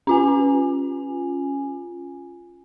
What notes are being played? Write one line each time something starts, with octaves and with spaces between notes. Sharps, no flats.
C#4 F4 G#5